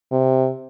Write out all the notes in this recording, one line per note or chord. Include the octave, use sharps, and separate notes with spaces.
C3